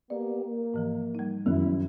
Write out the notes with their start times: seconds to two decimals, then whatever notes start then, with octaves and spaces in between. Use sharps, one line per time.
0.10 A#3 B3 G4 D5
0.45 A#3
0.74 G#2 E3 F3
1.15 G3 D#4
1.46 F#2 D#3 F3 E4